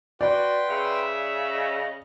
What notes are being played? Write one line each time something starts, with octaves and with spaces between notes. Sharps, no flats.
F#4 B4 D5 G5 C6
C#3 E5
D#5